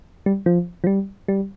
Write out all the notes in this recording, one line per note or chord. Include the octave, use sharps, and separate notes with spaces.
G3
F3
F3
G3
G3